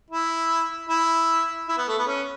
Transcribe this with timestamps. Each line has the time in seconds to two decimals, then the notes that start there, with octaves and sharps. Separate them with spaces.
0.11 E4
0.89 E4
1.69 E4
1.78 B3
1.88 A3
1.99 B3
2.07 C#4